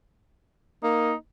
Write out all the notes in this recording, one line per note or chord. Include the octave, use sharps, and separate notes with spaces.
A#3 D#4